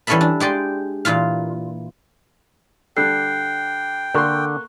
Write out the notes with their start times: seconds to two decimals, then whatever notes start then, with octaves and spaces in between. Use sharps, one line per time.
0.07 E3 G3 C#4 A4 E5 B5
0.21 D4
0.40 G#3 G4 D5 C6
1.05 A#2 E3 F4 F5
2.97 D3 G3 A4 G5 F#6 C7
4.14 D3 A#3 A4 C6 C#6 F#6